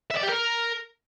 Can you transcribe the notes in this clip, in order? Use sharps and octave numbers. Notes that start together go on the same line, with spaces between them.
E5
D5
G4
A#4